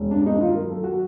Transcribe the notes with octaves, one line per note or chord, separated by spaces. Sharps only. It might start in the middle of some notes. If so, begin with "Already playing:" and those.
Already playing: E1
G2 D4
D#4
D#3
F4
F#3 A#4
A4
F#3
F#4